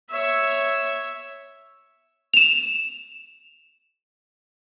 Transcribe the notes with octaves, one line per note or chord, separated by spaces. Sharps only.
C#5 E5
E7 F7